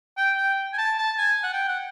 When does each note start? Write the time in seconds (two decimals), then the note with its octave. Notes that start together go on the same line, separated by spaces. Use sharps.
0.17 G5
0.37 G5
0.73 G#5
0.78 A5
0.98 A5
1.18 G#5
1.44 F#5
1.53 G5
1.69 F#5